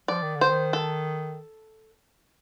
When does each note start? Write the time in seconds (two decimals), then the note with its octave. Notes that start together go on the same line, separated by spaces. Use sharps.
0.08 F3 D5
0.22 D#3
0.36 D3
0.41 C5
0.50 D#3
0.73 A4